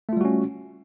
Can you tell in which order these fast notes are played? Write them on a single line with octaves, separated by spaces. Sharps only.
A3 F4 G3 F#4 C#4